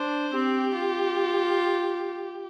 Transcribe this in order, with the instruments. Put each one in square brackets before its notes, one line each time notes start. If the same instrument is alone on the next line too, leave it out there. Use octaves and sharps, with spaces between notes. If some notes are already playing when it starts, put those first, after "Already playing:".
Already playing: [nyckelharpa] D4 [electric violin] C5
[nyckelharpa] C4 [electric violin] G4
[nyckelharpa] F4